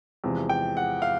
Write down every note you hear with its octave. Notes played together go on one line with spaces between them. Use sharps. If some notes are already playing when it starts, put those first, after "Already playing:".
E2 C3 F3 G#3
G5
F#5
F5